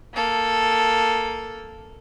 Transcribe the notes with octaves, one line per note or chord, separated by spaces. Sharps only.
A#3 A4